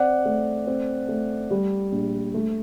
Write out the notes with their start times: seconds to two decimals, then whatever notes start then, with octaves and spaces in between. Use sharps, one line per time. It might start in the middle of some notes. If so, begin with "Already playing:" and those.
Already playing: C4 D5 F#5
0.26 A3
0.67 C4
1.09 A3
1.51 G3
1.92 A#1
2.34 A3